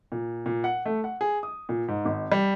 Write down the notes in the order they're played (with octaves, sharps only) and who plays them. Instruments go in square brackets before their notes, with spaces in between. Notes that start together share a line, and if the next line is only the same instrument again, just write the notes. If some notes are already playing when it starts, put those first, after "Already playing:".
[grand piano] A#2
A#2
F#5
A3
F#5
G#4
D#6
A#2
G#2
G#1
G3